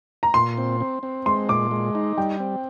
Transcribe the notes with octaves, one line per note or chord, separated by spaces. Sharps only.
A#5
A#2 C6
C4
C4
C4
G#3 C6
A#2 D6
G#3
D#4
G3 G5
C4